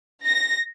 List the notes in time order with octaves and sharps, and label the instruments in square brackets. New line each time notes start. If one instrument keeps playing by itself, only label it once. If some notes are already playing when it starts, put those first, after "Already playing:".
[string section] A#6